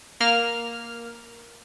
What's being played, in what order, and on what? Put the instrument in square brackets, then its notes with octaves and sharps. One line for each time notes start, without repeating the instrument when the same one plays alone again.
[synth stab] A#3 F6